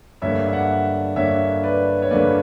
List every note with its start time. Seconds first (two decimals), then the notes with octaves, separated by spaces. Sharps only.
0.22 G2 D3 A#3 C#5 E5
0.48 E5
0.53 D5 F#5
1.16 G2 D3 A#3 C#5 E5
1.63 B4 D5
2.02 C#5
2.11 G2 D3 A#3 B4 D5